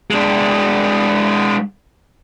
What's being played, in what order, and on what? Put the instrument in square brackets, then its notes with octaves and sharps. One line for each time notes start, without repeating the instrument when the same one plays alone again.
[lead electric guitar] G#3 D4